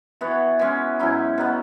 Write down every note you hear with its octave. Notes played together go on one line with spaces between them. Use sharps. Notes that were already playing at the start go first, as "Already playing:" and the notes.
E3 B3 F#4 C#5
E3 G#3 C#4
G#2 F#3 C#4 E4
B2 F#3 B3